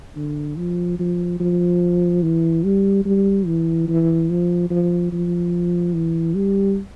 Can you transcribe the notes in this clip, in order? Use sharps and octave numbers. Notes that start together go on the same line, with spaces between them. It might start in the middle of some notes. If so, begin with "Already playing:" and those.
D3
F3
F3
F3
E3
G3
G3
E3
E3
F3
F3
F3
E3
G3